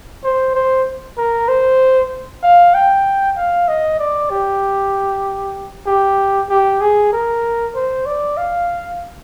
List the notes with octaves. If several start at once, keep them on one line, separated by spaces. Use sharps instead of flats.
C5
C5
A#4
C5
F5
G5
F5
D#5
D5
G4
G4
G4
G#4
A#4
C5
D5
F5